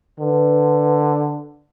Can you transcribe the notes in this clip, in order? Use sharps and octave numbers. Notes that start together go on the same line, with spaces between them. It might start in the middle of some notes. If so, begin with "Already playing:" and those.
D3 B4